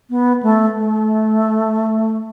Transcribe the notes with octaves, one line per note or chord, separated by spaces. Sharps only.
B3
A3
A3